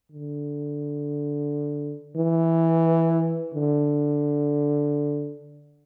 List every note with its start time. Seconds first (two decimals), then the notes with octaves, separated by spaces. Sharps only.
0.12 D3
2.16 E3
3.54 D3